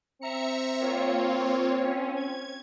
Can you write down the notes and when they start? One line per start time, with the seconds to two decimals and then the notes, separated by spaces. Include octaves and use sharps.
0.21 C4 E5 A#5 C#7
0.81 A#3 F4 C#5
1.84 C#4
2.16 G#6